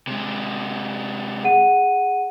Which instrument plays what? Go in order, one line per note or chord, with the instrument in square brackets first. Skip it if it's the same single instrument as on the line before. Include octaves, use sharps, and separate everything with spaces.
[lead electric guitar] C3 G#3
[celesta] G#4 F#5 D#7